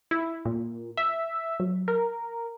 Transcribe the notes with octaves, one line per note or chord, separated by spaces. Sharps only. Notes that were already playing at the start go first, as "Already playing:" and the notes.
E4
A#2
E5
F#3
A#4